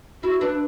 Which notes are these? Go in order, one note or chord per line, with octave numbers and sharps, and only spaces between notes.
E4 F#4
D4 B4